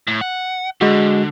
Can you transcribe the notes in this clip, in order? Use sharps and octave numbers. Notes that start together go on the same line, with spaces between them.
A2
F#5
D3 G#3 F#4